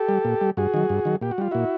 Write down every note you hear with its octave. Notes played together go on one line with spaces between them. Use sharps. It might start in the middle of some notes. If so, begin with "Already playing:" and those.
Already playing: G4 A4
G3
A#2
G3
G2 F#4 G#4
D#3 F#3
G2
D#3 F#3
A#2 G4
F#4
G3 F4
A#2 E4 F#4